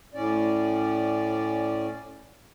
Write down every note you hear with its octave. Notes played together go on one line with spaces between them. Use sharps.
A2 C#4 D5